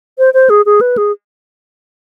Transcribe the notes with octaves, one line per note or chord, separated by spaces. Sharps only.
C5
C5
G#4
G#4
B4
G#4